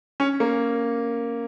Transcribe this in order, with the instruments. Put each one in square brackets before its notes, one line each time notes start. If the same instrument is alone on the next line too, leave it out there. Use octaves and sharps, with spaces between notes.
[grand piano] C#4
A#3